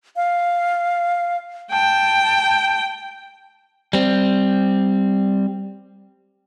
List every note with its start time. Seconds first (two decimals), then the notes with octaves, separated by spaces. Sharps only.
0.16 F5
1.72 G5 A5
3.93 G3 C4